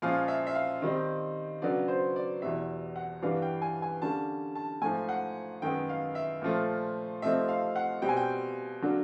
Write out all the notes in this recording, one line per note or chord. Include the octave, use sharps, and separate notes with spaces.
A#2 F3 G#3 C#4 F5
E5
E5
F5
D#3 G3 C4 D#4
C#3 F#3 B3 D4 D5
C5
D5
E2 B2 G3 E5
F#5
G2 E3 G3 B3 D4 F5
G5
G#5
G#5
D3 G3 A#3 C#4 A5
A5
G#2 F3 A3 G#5
F#5
F#2 D#3 G#3 B3 G5
F5
E5
A#2 F3 A3
C3 F3 A3 C4 D#4 E5
F5
F#5
B2 G3 C4 G5
G#5
G5
D3 F#3 A#3 D4